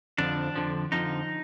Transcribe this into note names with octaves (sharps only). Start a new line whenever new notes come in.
F2 D3 F3 D4
F2 D3 F3
F2 D3 F3 D#4